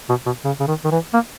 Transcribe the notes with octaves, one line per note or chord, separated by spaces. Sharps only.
B2
B2
C#3
C#3
D#3
D#3
E3
A#3